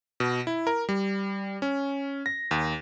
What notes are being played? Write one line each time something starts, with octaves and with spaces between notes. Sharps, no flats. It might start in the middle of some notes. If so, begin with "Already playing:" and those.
B2
E4
A#4
G3
C#4
A#6
D#2